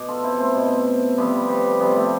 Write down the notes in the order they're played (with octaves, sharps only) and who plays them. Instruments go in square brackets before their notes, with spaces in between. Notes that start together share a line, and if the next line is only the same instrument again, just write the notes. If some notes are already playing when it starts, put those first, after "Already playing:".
Already playing: [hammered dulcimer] B2 D5
F4 A4
C4 E4
A3 C4
B2
C3 F3 G3 B3
G3 B3
C3 F3 G3 B3
A3 C4